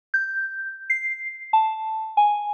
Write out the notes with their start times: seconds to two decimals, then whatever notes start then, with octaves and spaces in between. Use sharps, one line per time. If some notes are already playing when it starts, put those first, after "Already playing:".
0.14 G6
0.90 C7
1.53 A5
2.17 G#5